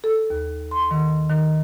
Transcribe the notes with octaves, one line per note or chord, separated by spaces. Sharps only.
A4
D#2
C6
D#3
D#3